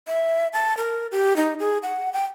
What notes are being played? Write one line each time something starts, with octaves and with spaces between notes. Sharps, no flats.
E5
A5
A#4
G4
D#4
G#4
F#5
G5